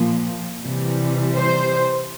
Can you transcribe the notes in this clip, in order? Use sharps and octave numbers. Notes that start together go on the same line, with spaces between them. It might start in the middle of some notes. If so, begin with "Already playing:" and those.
Already playing: A#2 F3
C3 E3 G3
C5